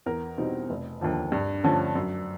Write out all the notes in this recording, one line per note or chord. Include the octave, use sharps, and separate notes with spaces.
E2 A#4
B2 G3 C4 D#4
F1
D#2 D3 F3
G2
D3 F3 A3 C#4
F#2